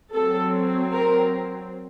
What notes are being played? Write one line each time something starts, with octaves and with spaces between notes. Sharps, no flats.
F#3 C4 A4
A#4